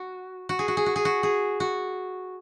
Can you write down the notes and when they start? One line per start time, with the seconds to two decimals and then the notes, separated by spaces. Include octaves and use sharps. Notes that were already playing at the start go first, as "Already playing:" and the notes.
Already playing: F#4
0.49 F#4
0.59 G#4
0.68 F#4
0.77 G#4
0.86 F#4
0.96 G#4
1.05 F#4
1.23 G#4
1.60 F#4